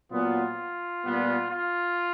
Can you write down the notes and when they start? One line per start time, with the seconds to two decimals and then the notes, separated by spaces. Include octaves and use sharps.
0.12 A#2 F#3 B3 F4
1.05 A#2 G3 B3
1.50 F4